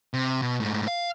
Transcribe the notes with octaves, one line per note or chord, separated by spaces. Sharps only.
C3
B2
G#2 A3
F5